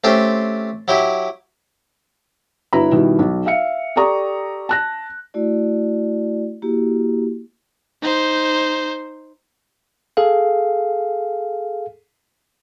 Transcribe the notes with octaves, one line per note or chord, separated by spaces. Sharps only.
A3 C4 C#4 G4 C5
F#3 E4 G4
G1 E4 F#4 B4 A#5 B5
B2 D#3 G3 E4
B1
E5 F5 C#7
G4 A4 D5 A#5 C#6 D#6
A5 F#6 A#6
A3 E4 F#4 D5
A#3 E4 F#4 G4
D#4 C5
G#4 A4 F5